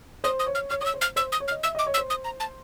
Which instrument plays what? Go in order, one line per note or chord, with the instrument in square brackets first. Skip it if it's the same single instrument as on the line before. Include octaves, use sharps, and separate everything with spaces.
[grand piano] C5 [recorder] D#6
[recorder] D#6
[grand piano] C#5
[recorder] F6
[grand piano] C#5 [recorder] F6
[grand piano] C#5 [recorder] D#6 E6
[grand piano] C5
[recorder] F6
[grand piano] C5 [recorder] E6
[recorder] D#6
[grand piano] C#5
[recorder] F6
[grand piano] D#5
[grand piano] E5 [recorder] E6
[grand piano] D#5 [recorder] D6
[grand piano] C#5
[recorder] E6
[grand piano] C5
[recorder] D#6
A#5
A5